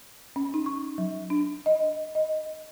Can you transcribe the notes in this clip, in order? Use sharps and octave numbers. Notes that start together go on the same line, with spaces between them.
C#4
D#4
C#6
F#3
D4
D#5
D#5